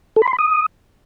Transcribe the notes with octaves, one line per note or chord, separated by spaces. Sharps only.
A4
B5
C6
B5
D#6